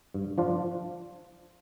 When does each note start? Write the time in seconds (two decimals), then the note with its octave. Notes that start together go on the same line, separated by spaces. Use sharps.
0.14 G2
0.38 F3 D4 F4